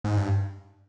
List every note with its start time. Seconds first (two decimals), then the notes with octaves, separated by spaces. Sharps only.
0.04 G#2
0.17 G2